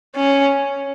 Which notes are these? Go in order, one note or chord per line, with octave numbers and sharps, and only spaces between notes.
C#4